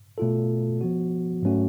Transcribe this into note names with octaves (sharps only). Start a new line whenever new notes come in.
B2 A3 F4 A4
F3 B3 F#4
G#2 F#3 A3 C#4 F#4